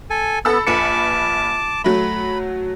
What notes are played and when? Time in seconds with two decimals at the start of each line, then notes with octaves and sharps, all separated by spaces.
0.10 A4 G#5
0.45 B3 A4 B5 E6
0.67 A#1 B4 A5 D6 C#7
1.84 F#3 A3 B5